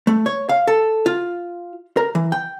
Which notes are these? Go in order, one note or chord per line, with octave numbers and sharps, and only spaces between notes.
A3
C#5
F5
A4
F4
A#4
E3
G5